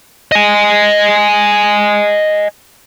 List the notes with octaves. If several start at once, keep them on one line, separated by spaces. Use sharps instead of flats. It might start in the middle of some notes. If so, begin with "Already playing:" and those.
D#5 G#5